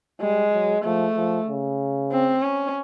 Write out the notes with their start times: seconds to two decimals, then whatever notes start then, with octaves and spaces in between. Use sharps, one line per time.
0.20 G3 G#3
0.53 F#3
0.84 F3 A3
1.16 F3
1.48 C#3
2.11 C4
2.43 C#4